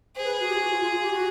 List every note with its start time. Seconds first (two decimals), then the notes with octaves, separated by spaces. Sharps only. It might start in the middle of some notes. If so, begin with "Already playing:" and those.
0.16 G#4 C5
0.25 B4
0.40 F#4
0.49 G4
0.55 F4
0.59 F#4
0.70 F4
0.81 F4
0.91 F4
1.02 G4
1.13 F#4